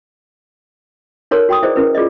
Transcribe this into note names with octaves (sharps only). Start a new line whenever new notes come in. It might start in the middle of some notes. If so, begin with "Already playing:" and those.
D#4 A4 A#4 C#5 A#5 C6
F#4 G5 A#5 C6 D#6
E4 G#4 B4 C5 D5 D#5
C#4 E4 A#4 B4
F4 G#4 D5 D#5